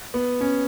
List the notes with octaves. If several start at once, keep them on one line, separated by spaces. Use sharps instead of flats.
B3
C#4